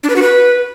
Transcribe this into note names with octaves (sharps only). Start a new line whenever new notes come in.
D4
B4
F#4
B4